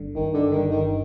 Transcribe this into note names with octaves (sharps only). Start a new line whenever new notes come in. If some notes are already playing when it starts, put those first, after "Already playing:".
Already playing: G1 G2 D3
G1 D#3
D3
G2 D3 D#3
D#3